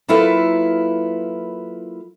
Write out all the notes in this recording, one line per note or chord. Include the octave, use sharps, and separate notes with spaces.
F#3 A#3 E4 F4 A4 B4